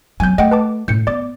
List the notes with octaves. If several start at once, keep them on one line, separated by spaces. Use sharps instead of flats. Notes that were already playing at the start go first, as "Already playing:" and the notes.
F#3 C4 G#5 G6
A3 D#5 F#5 G5
B4 A5 D6
A2 G6 C#7
B3 D5 D6